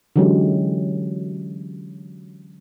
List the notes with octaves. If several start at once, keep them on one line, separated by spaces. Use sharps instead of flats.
D3 E3 F#3 G#3 C#4 G4